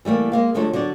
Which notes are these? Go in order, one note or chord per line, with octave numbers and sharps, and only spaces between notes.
E3 G3 A3 A#3
G#3 A#3 F5
D3 F3 F#3 G#3 A3 A4
D3 F#3 F#4 D5